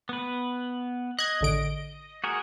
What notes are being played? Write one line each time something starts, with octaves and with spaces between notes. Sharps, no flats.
B3 B4
D#5 F#6 G#6
A1 D3 D7
F#4 G#4 A#4